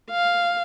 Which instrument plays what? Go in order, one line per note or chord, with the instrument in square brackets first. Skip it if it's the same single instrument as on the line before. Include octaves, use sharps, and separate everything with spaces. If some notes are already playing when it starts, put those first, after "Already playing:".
[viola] F5